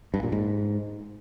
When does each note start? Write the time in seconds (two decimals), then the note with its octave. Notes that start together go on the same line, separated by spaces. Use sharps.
0.14 G2
0.23 A#2
0.32 G#2